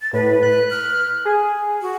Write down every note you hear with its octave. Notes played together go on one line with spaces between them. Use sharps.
A6
A2 B4
F#6
F6
G#4 G#5
F#4